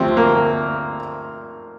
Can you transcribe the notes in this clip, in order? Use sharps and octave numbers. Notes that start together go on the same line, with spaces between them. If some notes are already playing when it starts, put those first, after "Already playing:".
Already playing: D2 C3 F3 C4
A#3